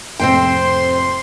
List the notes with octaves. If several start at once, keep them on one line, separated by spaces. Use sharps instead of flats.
F2 A2 C3 C4 C5 G5 C6